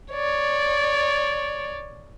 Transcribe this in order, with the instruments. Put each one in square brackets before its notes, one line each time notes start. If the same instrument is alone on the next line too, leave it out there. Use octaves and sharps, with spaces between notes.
[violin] C#5 D5